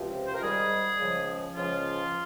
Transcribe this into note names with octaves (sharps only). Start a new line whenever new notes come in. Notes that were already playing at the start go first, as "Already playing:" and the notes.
Already playing: C#2 C3 F3
C5
A#4
G#2 D#3 G3 G#4
C#2 C#3 F3
C#2 C#3 F3 F4